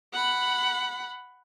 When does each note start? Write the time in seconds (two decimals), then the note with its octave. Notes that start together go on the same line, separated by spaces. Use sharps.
0.13 F#5 B5